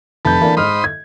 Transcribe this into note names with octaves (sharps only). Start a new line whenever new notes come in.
F1 A4 B4 G6
E3 A#3 D4
G#2 C5 D#5 B5 F6
G#6